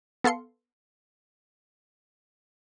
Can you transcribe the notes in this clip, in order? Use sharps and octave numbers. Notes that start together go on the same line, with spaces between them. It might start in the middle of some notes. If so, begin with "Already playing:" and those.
B3 A4 F5 C6 C#7